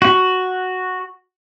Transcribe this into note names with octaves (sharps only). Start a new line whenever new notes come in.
F#4